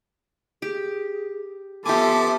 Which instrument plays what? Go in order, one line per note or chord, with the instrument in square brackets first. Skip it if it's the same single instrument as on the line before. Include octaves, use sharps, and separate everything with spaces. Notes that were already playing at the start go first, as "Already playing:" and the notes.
[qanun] G4 [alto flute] G#4
[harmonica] F3 D6 [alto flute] B3 [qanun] G4 G#5 [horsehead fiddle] A4 E5